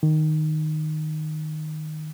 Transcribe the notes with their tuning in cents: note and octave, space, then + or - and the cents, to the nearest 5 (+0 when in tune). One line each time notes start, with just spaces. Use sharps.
D#3 -10